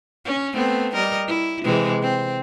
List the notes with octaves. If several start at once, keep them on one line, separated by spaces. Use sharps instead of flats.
C#4
A3 B3 C4
G3 A#4 D#5
E4
C3 E3 G#3
C4